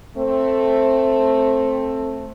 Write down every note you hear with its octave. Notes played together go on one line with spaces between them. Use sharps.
A3 C4